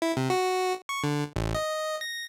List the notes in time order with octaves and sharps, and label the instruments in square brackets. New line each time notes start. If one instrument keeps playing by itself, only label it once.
[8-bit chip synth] E4
C3
F#4
C#6
D3
A1
D#5
A#6